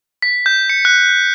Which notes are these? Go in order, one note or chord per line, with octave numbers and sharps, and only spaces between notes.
B6
G6
C#7
F#6